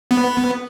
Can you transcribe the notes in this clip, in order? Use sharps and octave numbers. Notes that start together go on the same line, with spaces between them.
B3